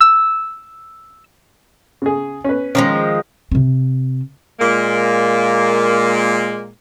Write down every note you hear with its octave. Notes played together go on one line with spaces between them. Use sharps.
E6
C#3 G#4
C#4 B4
D#3 F3 G#3 C#4
C3 C4
A#2 G#3 A#3